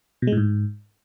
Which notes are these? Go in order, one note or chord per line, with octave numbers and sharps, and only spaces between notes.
B2
G#3
A2
G#2